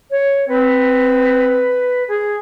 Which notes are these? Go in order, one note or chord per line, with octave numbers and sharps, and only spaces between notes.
C#5
C4 B4
G#4